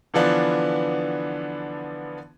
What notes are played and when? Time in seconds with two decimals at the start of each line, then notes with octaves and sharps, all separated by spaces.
0.14 D3 E3 F3 B3 D4